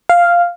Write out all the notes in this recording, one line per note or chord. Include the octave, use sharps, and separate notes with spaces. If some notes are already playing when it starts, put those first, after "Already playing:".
F5